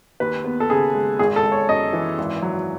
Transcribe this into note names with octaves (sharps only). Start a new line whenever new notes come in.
D#2 B4
B3
A4
C#3 G#4
G#3
G#1 G#4
A4
G#1
C#5
F#2 D#5
E3
G#1
F#3